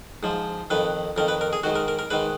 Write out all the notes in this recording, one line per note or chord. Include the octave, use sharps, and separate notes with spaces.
G#2 F3
F2 D#3 B4
F2 D#3 A#4
B4
A#4
G#4
G#2 D#3 F#4
A#4
A#4
A#4
G#2 D#3 B4